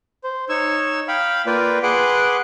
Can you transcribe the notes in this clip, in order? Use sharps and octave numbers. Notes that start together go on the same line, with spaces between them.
C5
D#4 C#5 C#6 E6
F5 G5 B5
A#3 F4 B4 D5 G5
G#4 B4 F#5 C6 D6